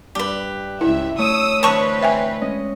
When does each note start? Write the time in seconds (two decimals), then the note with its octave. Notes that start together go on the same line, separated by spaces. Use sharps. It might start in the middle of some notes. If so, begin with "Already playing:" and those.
0.15 G2 G4 B4
0.81 C#2 E4 E5
1.19 A3 C#5 C#6 D#6 E6
1.63 D3 E3 C4 B4 C#5 A5 C#6 D#6
2.03 E5 G5 G#5
2.41 G#3 C#4 D#5